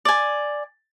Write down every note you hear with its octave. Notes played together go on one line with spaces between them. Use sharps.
D5 G#5